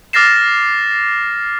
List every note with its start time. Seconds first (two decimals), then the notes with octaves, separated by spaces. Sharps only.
0.13 D6 F6 A6 A#6 C7 E7